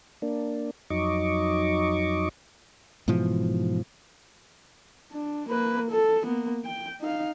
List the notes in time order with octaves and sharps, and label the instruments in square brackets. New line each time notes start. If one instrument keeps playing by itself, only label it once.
[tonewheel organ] A#3 D4
F2 F#3 D#4 D#5 C#6 D6
[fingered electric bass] G#2 B2 E3 F3
[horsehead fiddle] D4
A#3 B4
A4
A#3 B3
G5
D#4 F5